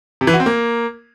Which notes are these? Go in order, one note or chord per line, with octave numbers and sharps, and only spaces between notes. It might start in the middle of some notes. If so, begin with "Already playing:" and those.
C3
E3
F#4
C4
A#3